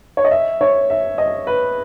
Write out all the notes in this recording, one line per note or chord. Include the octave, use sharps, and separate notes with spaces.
C#5
D#5
E5
C#5
E5
D#5
B4